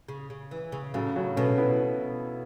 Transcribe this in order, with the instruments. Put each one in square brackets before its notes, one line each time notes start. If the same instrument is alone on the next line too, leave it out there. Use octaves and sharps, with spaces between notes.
[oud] C#3
C#3
E3
C#3
[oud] A2 [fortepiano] C#3 F#3
[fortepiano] C#3 F#3
[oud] B2 [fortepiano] A3 C#4
[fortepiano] B3 E4